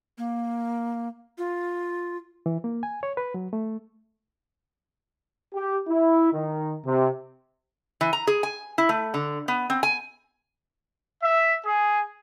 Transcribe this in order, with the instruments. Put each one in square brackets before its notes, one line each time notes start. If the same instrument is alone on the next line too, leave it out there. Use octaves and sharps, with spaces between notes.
[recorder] A#3
F4
[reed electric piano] E3
A#3
G#5
C#5
B4
F#3
A3
[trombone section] G4
E4
D#3
C3
[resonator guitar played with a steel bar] E3
A#5
G#4
G#5
E4
A3
D3
B3
C4
G#5
[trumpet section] E5
G#4